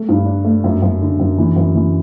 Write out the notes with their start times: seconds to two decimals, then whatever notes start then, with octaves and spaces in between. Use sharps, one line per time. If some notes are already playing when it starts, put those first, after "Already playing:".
Already playing: A3
0.09 G2
0.26 D4
0.45 A3
0.64 F#2
0.82 F#2
1.01 D3
1.19 F#2
1.38 E3
1.56 F#2
1.75 E3